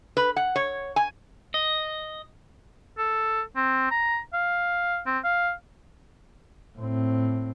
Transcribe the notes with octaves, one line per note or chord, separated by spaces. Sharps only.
B4
F#5
C#5
G#5
D#5
A4
C4
A#5
F5
C4
F5
A2 C4